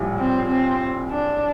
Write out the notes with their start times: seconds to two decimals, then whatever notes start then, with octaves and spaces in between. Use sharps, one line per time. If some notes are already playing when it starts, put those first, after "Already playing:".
Already playing: A#1 A2 G3
0.18 C4
0.49 C4
1.11 D4